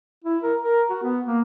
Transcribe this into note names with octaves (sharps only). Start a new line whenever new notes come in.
E4
A#4
A#4
F#4
B3
A#3